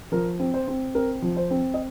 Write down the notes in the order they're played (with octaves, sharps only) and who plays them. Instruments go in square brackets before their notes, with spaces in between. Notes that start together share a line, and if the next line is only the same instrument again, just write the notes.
[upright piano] F3 A#4
C4
C5
C4
C4 A#4
F3
C5
C4
D#5